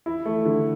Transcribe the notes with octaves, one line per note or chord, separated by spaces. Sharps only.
E4
A3
D3